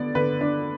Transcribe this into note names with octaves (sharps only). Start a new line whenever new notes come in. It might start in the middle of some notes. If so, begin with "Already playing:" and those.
Already playing: D3 B3 D5
D3 B4
D4